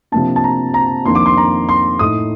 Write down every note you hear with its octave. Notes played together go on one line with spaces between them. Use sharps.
C3 F3 A#3 D4 A5
A5
A#5
A#5
F2 D#3 A#3 D4 C6
D6
C6
A#5
C6
A2 A3 D#4 D#6